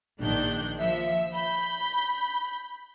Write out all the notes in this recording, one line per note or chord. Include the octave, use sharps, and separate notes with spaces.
A#1 D#3 D4 F#6 G6
F3 E5
B5 G6